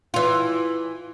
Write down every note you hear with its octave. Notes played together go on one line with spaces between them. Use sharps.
E3 F4